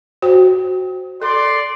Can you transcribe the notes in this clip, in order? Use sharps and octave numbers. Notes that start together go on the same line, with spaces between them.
F#4 C5 G5
A4 D5 C6